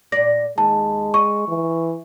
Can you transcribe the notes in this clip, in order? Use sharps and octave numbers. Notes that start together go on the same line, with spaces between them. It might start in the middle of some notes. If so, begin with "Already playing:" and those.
A#2 D5 A#6
D#2 G#3 A5
D#5 C#6
E3